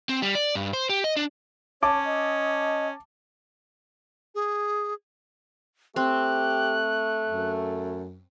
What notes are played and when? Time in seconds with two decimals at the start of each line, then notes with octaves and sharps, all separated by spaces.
0.09 C4
0.22 G3
0.35 D5
0.55 G2
0.73 C5
0.89 G4
1.04 D#5
1.17 D4
1.83 C#4 C#5 A5 D6
2.05 D#5
4.35 G#4
5.96 A3 C4 G4 F#6
7.26 F#2